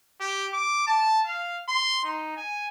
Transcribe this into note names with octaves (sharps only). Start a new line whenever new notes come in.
G4
D6
A5
F5
C6
D#4
G#5